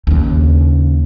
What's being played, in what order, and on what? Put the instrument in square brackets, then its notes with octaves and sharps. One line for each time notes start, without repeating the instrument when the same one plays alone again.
[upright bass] D#2 C#3